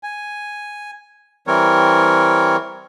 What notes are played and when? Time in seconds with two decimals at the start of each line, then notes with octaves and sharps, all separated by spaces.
0.03 G#5
1.47 E3 G3 C4 A#4 C#5